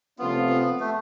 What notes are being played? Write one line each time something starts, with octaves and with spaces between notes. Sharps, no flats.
C3 F3 A3 B3 C#4 F4
B3
A3